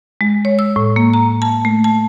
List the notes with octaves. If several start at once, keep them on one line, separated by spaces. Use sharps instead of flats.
G#3
C#5
E6
A2
A#3
A#5
A5
A3
A5